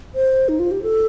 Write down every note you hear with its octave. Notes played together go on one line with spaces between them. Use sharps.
C5
D#4
F4
G4
A4